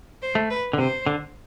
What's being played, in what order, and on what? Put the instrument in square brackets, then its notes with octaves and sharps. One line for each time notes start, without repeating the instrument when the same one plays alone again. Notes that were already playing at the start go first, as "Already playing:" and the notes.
[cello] C5
[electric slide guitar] A3
[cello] B4
[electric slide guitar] D3
[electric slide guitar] C3 [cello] C5
[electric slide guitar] D3